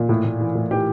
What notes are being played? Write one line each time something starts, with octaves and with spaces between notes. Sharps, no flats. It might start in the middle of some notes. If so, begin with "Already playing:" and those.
Already playing: A#2
A2
A2
E3
A2
E3 G4